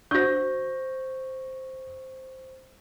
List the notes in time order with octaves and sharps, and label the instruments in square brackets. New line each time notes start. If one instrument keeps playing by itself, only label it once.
[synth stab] D3 F#4 [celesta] C5 C#6 [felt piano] G6 A#6